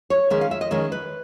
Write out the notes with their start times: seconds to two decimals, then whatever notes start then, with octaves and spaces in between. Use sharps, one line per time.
0.10 C#5
0.30 D#3 G#3 C#4 E5
0.41 F5
0.51 E5
0.61 D#5
0.71 D#3 G#3 C#4 E5
0.92 B4